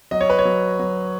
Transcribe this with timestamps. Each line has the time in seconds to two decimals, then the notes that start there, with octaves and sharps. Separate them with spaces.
0.11 F#3 D#5
0.21 C#5
0.30 B4
0.39 C#5
0.45 F#3
0.79 F#3